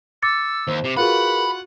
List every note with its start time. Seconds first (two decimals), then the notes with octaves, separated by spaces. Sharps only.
0.22 D6 E6 A6 C#7
0.67 D#2 C5
0.84 C3
0.97 F4 F#4 G#4 A#4 B4 F#5 B5